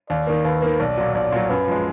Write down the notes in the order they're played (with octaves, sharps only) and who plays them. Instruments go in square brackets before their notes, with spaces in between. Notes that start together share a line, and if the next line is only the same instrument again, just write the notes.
[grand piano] D#2 [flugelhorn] D5
[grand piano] D#3 A#3
[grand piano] D#2 [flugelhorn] B4
[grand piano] D#3 A#3
[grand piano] B1 [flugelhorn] D5
[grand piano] A#2 F#3
[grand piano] B1 [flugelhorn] D5
[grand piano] A#2 F#3
[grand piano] F#2 [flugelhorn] B4
[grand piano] F3 G#3